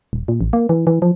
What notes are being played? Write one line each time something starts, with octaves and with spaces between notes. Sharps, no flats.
D#1
A#2
A1
A#3
E3
E3
F3